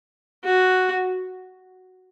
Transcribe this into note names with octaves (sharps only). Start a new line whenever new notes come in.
F#4